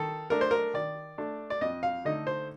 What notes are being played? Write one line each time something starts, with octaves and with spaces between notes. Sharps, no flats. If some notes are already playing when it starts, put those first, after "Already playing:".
Already playing: D#3 A4
A3 D4 A#4
C5
A#4
D#3 D5
A3 D4
D5
F2 D#5
F5
D3 A3 D#4 D#5
C5